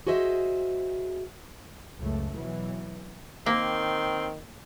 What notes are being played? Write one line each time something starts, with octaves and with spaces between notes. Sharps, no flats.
F#4 G#4 C5 D#5 E5
C#2 F#2 A3
B2 E3 F#3
D#3 A#3 C4